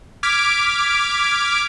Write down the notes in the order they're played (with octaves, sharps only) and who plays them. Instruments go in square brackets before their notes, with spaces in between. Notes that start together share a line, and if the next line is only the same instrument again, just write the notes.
[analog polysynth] D6 F6 G#6 B6 D7